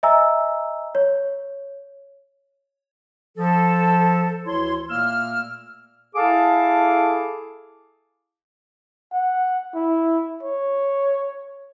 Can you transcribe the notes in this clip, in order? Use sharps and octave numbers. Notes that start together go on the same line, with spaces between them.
D#5 E5 G#5 A#5 E6
C#5
F3 A4
D2 E3 E4 C#5 C6
A#2 A3 A#3 E6 F6
E4 G#4 A4 F5 A5 D6
F#5
E4
C#5